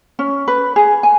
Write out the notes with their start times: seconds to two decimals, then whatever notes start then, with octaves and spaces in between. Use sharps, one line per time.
0.19 C#4
0.48 B4
0.76 G#4
1.03 G#5